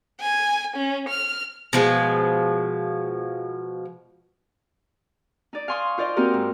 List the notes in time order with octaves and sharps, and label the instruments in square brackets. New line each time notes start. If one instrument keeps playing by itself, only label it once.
[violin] G#5
C#4
F6
[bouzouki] B2 F3 G#3
[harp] D#4 D5
F5 G#5 C6 C#6 D#6
F4 C5 D5 D#5 F5
A#3 C4 D#4 F#4 G4 A#4
G#2